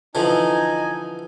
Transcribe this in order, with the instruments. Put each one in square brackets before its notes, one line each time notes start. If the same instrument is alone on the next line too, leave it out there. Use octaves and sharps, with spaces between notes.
[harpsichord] D3 E3 F3 [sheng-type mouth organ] D#4 G#5